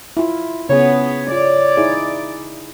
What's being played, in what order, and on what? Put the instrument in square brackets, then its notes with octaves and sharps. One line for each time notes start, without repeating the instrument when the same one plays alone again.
[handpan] E4 F4
[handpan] C#3 G#4 [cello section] B3 [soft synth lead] C#5
[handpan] F4 [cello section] D5
[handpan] D#4 E4 G#4